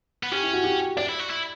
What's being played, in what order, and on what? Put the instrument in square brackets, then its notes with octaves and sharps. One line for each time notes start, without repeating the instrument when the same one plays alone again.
[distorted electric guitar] B3
[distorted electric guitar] C#4 [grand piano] G4
[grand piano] E4
F#4
G4
[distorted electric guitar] D4 [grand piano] D5
[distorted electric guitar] E4
F#4
E4